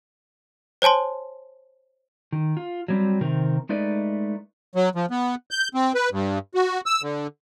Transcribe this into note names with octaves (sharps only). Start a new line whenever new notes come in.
C5 C#5 G#5 A5 C6
D#3
F4
F#3 G3 C4
C3 D#3 C4 A#4
G#3 A3 D#4 B4 D5
F#3
F3
B3
G6
C4
B4
G2
F#4
E6
D3